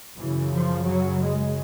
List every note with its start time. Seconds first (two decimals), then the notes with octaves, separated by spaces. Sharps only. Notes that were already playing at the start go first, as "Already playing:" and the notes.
0.16 F#2 C#3 E3
0.52 F3
0.86 F#3
1.21 G#3